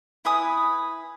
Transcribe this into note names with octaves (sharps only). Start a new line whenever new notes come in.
E4 B4 G#5 D#6